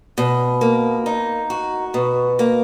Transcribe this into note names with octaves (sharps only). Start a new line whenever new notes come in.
B2
A#3
D#4
F#4
B2
A#3